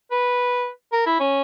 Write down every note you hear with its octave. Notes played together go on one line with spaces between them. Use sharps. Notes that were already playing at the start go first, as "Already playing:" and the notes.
B4
A#4
E4
C#4